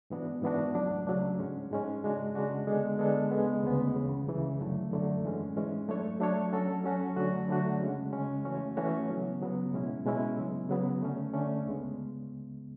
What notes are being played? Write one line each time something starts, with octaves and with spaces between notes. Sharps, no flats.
G#2 E3 B3 D4 F#4
G#2 E3 B3 D4 F#4
C#2 C#3 F#3 A3 D4
C#2 C#3 F#3 A3 D4
G#2 G#3 C#4
G#2 G#3 C#4
C#3 G#3 D4 F#4
C#3 G#3 D4 F#4
D3 G#3 B3 D4 A4
D3 G#3 B3 D4 A4
D2 C#3 G#3 B3
D2 C#3 G#3 B3
C#2 C#3 E3
C#2 C#3 E3
F#2 D3 F#3 A3
F#2 D3 F#3 A3
G#2 E3 G#3 C#4
G#2 E3 G#3 C#4
F#3 A3 D4 A4 C#5
F#3 A3 D4 A4 C#5
F#3 C#4 F#4 A4
F#3 C#4 F#4 A4
D3 F#3 A3 D4 F#4
D3 F#3 A3 D4 F#4
C#3 G#3 C#4
C#3 G#3 C#4
E3 A3 C#4 F#4 C#5
E3 A3 C#4 F#4 C#5
C#3 F#3 B3
C#3 F#3 B3
B2 G#3 C#4 E4
B2 G#3 C#4 E4
C#3 F#3 B3
C#3 F#3 B3
D3 A3 C#4
D3 A3 C#4
C#2 C#3 G#3 B3